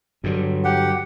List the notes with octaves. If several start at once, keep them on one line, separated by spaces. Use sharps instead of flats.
G2 D3 F#3
G4 F#5